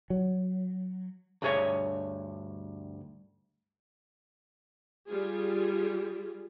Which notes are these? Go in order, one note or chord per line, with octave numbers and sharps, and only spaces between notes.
F#3
D2 G2 G#4 C#5 G#5
G3 F4 G#4